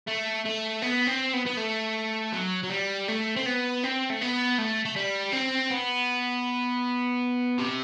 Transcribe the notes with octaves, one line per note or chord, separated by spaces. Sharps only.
A3
A3
B3
C4
B3
B3
A3
F#3
F#3
G3
A3
C4
B3
C4
A3
B3
A3
A3
G3
C4
B3
C3